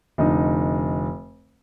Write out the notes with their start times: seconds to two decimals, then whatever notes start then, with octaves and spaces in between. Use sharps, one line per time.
0.18 F1 D3 D#4